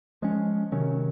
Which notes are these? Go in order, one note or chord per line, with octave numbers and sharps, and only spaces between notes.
F3 G#3 C#4
C3 D#3 F#3 C#4